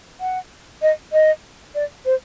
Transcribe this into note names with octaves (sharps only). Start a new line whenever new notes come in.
F#5
D#5
D#5
D5
C5